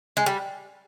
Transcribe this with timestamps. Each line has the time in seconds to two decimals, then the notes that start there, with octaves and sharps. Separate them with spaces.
0.17 G#3
0.26 G3